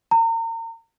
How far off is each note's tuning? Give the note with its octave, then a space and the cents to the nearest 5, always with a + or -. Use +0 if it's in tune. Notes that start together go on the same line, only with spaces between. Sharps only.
A#5 -35